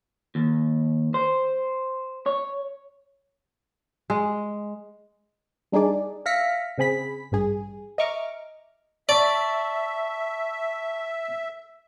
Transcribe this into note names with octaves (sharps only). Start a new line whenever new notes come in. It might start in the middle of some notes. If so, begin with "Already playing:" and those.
D#2
C5
C#5
G#3
G3 D4 D#4 G#4 D5
E5 F5 F6 A#6 B6 C#7
C#3 C4 G#4 B5 B6
A1 G2 G#4
D#5 E5 A#5 C#6 D6 F6
D5 E5 A5 C#6